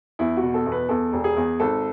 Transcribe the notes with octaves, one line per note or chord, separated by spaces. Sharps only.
E2 E4
F#4
B2
A4
E2
B4
E2 A4
E1
G#4
E2
G#1 A4